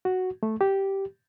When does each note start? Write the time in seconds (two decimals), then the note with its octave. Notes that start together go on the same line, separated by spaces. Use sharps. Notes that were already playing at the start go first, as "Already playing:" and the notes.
0.05 F#4
0.43 A3
0.61 G4